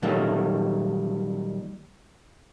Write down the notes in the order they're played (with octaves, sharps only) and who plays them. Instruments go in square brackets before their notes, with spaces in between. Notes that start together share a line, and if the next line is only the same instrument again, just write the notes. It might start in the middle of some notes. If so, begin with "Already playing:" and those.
[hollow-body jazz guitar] A#2 D#3 F#3 G3 A3 A#3